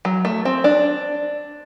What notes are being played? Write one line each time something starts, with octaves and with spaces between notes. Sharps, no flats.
F#3
A3
C4
D4